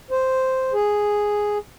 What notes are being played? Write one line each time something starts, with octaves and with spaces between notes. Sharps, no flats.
C5
G#4